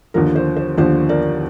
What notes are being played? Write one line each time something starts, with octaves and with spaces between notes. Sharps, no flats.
D#2 D3 F3 A#4
C5
C5
D#2 D3 F3 C5
A#4 D5